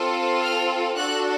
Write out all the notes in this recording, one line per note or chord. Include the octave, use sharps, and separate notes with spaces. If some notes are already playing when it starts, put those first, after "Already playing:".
Already playing: C4 F4 A4
F6
D4 F#4 A4 F#6